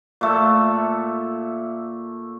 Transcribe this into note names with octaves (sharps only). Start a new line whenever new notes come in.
A#2 A3 E5